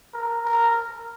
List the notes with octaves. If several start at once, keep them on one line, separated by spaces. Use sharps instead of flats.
A#4
A#4